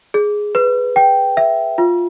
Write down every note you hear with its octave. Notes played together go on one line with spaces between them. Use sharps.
G#4
B4
G5
E5
F4